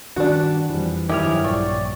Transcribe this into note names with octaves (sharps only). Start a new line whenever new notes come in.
G2 D#3 D4 F#4
F2 E3 G3
G2 D#3 F3 F#3 E4 G4 G#4 F6
A#1 D5 G5 C#6